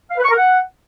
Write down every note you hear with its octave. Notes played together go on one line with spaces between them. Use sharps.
F5
B4
C#6
A#4
F#5